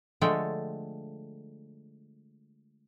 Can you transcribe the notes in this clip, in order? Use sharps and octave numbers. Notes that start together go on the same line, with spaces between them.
D3 F3 G#3 A3 A4 G5